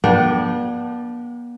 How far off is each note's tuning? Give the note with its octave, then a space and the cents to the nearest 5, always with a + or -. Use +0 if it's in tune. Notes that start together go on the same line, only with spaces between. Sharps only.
B3 -45 D4 +0 G5 -35